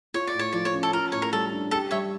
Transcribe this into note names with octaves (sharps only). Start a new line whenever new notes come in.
F4 C#5
D5
A2
C#5
F3 D5
C#5
C#4
A4
F4 A#4
A2 C#5
A#4
G3 A4
D4
G4 A4
G3 C#5 E5